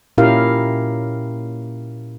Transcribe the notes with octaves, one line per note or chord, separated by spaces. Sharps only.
A#2 C#4 E4 G4 A#4 F5